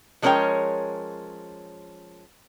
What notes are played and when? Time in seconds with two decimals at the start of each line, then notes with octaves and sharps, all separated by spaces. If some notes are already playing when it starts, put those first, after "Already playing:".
0.22 F3 G#3 C#4 A#4 C#5 G5